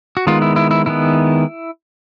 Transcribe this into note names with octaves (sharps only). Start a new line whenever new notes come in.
F#4
D#3 G#3 B3 F4
E4
E4
E4
D#3 G#3 B3 E4